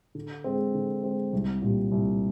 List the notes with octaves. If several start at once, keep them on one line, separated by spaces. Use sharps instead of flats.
D3
G#3 C4
D3
G#3 C4
C2
A#2 G3
C2